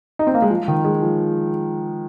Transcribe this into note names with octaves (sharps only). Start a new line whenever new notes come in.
D#4
C4
A#3
G#3
F3
D#3
G#3
F3